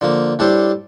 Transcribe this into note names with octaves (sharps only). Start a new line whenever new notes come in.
D3 F3 A#3
A2 G3 D4 A4 C5